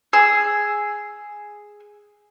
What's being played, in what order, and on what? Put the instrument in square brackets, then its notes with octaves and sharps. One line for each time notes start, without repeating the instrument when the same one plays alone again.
[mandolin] G#4 E6